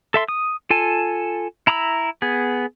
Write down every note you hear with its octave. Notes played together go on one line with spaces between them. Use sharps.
A4 E5 C6
D#6
F4 A4 G#5 A5
E4 A#5 B5 D#6 E6
B3 G#4